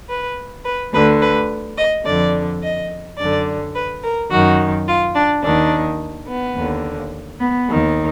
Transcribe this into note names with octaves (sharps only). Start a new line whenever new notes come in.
B4
B4
D2 D3 B4
B4
D#5
F2 D3 D5
D#5
F#2 D3 D5
B4
A#4
F#2 D#3 F#4
F4
D4
D#2 D#3 D4
B3
D#2 D3
B3
D#2 D#3